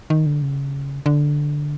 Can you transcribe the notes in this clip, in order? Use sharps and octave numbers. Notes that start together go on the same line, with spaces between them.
D#3
D3
C#3
D3